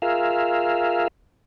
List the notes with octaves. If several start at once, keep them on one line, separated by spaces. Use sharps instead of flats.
F4 G#4 A#4 E5 F5